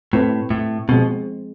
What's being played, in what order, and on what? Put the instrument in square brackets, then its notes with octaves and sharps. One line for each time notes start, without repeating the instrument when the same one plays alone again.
[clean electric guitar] A2 [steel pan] A3 C4 E4 B4
[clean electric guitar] A2
[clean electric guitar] B2 [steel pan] F3 G#3 C4